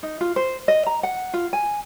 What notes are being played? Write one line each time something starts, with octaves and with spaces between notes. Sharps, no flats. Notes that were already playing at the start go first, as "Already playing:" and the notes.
D#4
F4
C5
D#5
A#5
F#5
F4
G#5